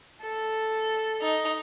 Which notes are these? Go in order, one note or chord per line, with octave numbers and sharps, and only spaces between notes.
A4
D#4